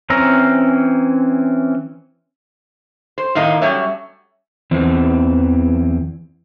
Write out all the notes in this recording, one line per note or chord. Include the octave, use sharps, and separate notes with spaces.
E3 C4 C#4 A#5 E6
C5
A2 D#3 A#3 D#4
F#3 G3 A3 C#4 C#5 E5
E2 E3 C4